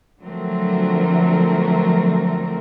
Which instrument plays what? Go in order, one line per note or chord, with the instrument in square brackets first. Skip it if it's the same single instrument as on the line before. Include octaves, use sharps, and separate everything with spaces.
[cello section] D3 F3 F#3 A3 C4 A#4